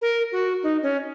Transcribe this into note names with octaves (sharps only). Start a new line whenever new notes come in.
A#4
F#4
D#4
C#4